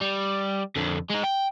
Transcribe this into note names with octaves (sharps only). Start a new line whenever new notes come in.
G3
F2 D3
G#3 D#4
G5